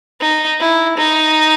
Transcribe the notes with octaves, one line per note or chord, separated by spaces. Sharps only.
D#4
E4
D#4